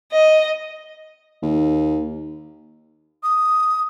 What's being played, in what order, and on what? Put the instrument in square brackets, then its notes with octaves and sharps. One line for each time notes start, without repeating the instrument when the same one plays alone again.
[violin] D#5
[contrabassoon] D#2
[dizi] D#6